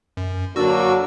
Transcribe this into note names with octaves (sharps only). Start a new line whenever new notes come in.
F#2
D3 F#3 A#3 D4 F#4 E6